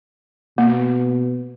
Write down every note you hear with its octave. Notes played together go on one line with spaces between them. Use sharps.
B2 A#3